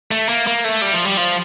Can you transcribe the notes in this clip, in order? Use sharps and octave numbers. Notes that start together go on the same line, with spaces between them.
A3
A#3
A#3
A3
G3
F3
G3
F3